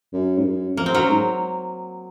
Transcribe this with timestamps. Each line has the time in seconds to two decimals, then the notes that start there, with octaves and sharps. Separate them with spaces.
0.13 F#2
0.38 G#2
0.45 F#2
0.77 F2 A#3
0.86 C4
0.92 F#2 F#3 A#3
1.09 G#2